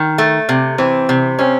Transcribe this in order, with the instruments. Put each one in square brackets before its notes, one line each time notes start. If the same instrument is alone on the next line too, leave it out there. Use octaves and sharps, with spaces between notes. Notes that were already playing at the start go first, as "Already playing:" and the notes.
Already playing: [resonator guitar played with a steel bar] D#3
A3
C3
[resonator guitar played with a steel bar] E3 [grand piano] C4
[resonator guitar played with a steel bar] C3
[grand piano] C4 [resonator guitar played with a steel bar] C#4